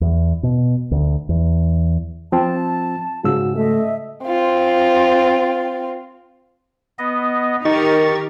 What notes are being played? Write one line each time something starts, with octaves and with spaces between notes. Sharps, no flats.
E2
B2
D2
E2
F3 C4 F4 A5
G#2 C#3 F#4 E6
A3 D#5 E5
C4 F4
B3 D#5
D#3 D#4 G4 A#4 C#6 A6